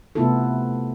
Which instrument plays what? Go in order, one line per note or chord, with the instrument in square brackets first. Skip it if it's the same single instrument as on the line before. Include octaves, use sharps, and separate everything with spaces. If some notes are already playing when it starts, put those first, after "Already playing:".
[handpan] C3 A3 B3 E4 F4 A4